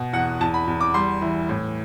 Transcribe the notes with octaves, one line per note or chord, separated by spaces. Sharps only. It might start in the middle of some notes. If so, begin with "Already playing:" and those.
Already playing: B2
E2 F#5
E2 A5
B5
E2
D6
G3 C6
E3
A2